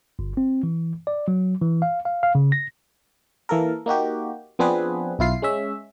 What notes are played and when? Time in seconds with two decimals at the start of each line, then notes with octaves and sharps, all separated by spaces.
0.19 G1
0.37 C4
0.63 E3
1.07 D5
1.28 F#3
1.62 E3
1.82 F5
2.05 F5
2.23 F5
2.35 C#3
2.52 A#6
3.49 E3 A#3 A4 A#4
3.86 A#3 D#4 F#4 G4
4.59 F3 B3 C4 D4 G#4 B4
5.19 B1 E4 F4 C7
5.42 G#3 C#4 E5